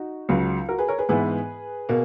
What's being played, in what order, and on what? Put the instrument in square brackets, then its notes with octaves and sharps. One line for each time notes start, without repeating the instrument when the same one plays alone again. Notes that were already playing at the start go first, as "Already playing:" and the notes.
Already playing: [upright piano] D#4 F#4
[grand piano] C#2 C#3 F#3
[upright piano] F#4 A#4
G#4 B4
A#4 C#5
G#4 B4
[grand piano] G#2 E3 B3 E4 [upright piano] G#4 B4
[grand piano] B2 A#3